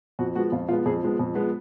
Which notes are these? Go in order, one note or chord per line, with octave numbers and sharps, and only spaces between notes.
F2 F#4
F3 G#3 B3 F#4
F2 F4
F3 G#3 B3 F4
F2 G#4
F3 G#3 B3
F2
F3 G#3 B3